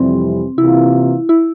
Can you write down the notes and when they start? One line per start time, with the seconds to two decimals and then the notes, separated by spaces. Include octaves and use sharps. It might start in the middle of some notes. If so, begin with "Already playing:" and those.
Already playing: F2 C3 E3 G3 C4
0.58 C3 E3 A#3 E4 F4
1.29 E4